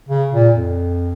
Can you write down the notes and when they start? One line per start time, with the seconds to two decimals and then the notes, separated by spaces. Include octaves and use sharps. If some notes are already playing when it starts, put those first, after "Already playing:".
0.09 C#3
0.33 A#2
0.54 F2